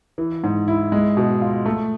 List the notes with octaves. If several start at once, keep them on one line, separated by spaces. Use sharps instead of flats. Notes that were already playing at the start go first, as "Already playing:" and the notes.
E3
G#2
E4
G#3
B2
F4
A3